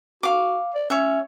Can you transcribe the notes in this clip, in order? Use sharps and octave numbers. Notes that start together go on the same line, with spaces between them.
F#4 F5 D6
D5
C#4 C#5 E5